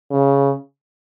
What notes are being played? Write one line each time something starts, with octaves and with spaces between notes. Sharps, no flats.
C#3